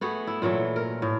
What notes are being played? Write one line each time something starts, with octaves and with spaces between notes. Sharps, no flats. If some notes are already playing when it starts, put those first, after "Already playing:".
A3 B3 F#4 G#4
E4
A#2 E3 F#3 A3
A#4
A2